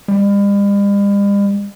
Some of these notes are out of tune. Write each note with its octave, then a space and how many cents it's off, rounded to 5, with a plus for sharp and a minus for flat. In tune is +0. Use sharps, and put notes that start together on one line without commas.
G3 +45